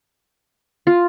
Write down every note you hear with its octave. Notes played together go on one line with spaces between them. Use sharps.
F4